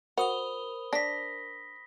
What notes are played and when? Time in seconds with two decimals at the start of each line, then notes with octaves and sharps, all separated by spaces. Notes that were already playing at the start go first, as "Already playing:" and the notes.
0.18 F#4 A#4 C5 B5 D#6 G7
0.93 D4 A#6 B6